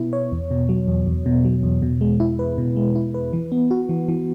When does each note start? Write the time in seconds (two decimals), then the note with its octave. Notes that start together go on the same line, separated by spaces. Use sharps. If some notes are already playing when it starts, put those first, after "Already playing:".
Already playing: B2 B3 E4
0.13 C#5
0.32 E2
0.51 B2
0.69 F#3
0.88 E2
1.07 E2
1.26 B2
1.45 F#3
1.63 E2
1.82 B2
2.01 G#3
2.20 E4
2.39 B4
2.58 B2
2.76 G#3
2.96 E4
3.14 B4
3.33 E3
3.52 B3
3.71 F#4
3.89 E3
4.08 E3